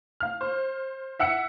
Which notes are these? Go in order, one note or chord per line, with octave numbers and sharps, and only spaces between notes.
F5 F6
C5
E5 F#5 E6 C#7